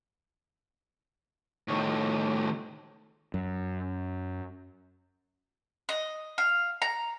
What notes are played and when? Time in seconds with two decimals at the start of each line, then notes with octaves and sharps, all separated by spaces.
1.68 A2 D#3
3.34 F#2
5.89 D#5
6.38 F5
6.82 A#5